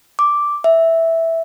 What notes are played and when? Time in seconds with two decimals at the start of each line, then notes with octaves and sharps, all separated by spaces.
0.19 D6
0.64 E5